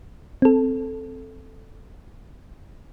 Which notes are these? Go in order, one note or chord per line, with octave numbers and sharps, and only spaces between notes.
C4 A4